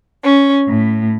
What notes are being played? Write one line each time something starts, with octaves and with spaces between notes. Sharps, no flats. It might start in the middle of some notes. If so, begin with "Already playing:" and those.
C#4
A2